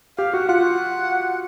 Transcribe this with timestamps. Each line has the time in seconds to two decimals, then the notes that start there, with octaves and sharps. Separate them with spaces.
0.18 G4 F5
0.34 F#4 F#5
0.49 F4 F#5